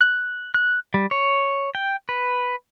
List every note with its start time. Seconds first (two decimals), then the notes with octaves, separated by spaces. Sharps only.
0.01 F#6
0.54 F#6
0.94 G3
1.11 C#5
1.75 G5
2.09 B4